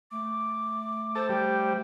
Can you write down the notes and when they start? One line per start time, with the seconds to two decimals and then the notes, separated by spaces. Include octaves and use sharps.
0.11 A3 D6
1.15 A4 C5
1.29 G3